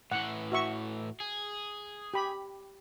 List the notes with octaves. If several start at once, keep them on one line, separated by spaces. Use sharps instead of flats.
A2 E3 F#5
F#4 E5 C#6
G#4
G4 B5